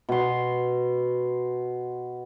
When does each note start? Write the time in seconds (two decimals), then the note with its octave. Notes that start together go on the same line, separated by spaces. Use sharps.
0.09 B2 C6